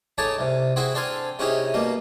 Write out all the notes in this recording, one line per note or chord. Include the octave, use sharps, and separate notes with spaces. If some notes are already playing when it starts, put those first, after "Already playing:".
A3 D#4 G#4 C#5 D5 A5
C2 C3
C4 E4 F#4 G#4 E5
C4 D4 A4 C5 F5 G#5
C3 C#4 D#4 E4 G4 G#4
B2 G3 A#3